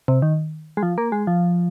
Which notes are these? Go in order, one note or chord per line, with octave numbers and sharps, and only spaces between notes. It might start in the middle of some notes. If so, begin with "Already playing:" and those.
C3
D#3
G#3
F3
A#3
G#3
F3